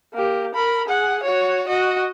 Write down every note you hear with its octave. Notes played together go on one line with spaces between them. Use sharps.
A#3 G4
A#4 B5
G#4 F#5
F#4 C#5
F#4 D#5